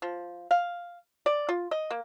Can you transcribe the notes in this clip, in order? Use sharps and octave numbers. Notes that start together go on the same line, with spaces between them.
F3
F5
D5
F4
D#5
A#3